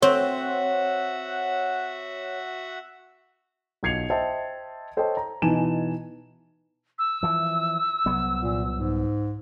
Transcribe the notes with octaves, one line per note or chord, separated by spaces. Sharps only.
C4 F#4 C#5 E5 F#5
B1 F4 G#6 C7 C#7 F7
C5 D#5 E5 G5 A5
A4 C5 C#5 D#5 G5 A5
A#5
B2 E3 D#4 G#5 A5 E7
E6
E3 F3
C2 F#3 B3
A#2
G#2